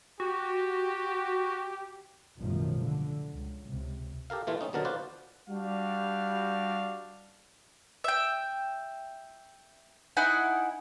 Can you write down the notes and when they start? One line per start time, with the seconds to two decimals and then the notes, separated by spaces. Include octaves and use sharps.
0.20 F#4 G4
2.39 A1 F#2 B2 D#3 F3 G3
2.81 D3
3.32 C#2
3.68 C#2 C3
4.30 G4 A4 A#4 F5
4.47 A#2 E3 A3 F4
4.61 G#3 C4 C#4 D#4
4.73 D#2 B2 D3 F#3 A#4 A5
4.85 F4 F#4 B4 C5 D5
5.49 G3 D4 F#4 F5
8.04 E5 G5
10.17 D#4 E4 F#5 G#5